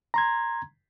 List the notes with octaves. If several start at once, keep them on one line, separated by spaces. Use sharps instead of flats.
A#5 C6 G#6